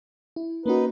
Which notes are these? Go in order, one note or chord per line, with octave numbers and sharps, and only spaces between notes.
E4
A#3 C#4 D#4 F#4 B4